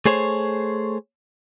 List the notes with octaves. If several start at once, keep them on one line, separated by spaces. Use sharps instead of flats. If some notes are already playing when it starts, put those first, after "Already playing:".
A3 G#4 C5 C#5